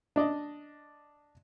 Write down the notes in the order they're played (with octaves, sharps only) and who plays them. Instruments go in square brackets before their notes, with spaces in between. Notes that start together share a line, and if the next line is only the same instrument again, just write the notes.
[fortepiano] D4 D5 D#5